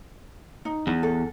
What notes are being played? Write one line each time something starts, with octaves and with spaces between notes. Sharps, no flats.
D#4
E2
A4